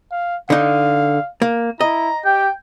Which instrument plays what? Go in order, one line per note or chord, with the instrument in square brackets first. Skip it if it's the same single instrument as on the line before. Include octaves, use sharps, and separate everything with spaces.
[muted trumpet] F5
[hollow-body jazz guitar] D3 D#4 [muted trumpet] F5
[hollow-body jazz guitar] A#3
[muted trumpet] E4 [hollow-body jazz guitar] D#5 [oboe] A#5
[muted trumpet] G4 [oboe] G5